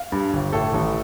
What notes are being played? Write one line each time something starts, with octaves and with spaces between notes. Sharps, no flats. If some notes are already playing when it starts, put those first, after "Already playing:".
Already playing: F5
G2
G1
A2 A4
A1